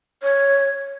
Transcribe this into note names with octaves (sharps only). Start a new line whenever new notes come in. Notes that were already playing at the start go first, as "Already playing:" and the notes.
C#5